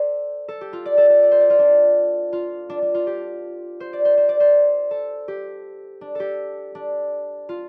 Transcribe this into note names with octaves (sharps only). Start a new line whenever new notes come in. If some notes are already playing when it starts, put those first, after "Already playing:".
Already playing: A4 C5 D5
A4
G4
F4
D5
A4
A4
D5
C5
D5
F4
D4
F4
D4
D4
F4
G4
C5
D5
C5
C5
D5
C5
A4
G4
D4
G4 A4
D4
F4